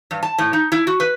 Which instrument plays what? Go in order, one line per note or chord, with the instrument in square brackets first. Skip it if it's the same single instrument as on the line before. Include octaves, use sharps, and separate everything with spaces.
[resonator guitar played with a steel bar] G2
A5
A2
D#4
E4
F#4
B4